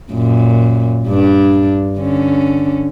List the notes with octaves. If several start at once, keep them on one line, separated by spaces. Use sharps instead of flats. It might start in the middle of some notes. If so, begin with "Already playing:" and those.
F#2 A#2
G2 D4
D3 C#4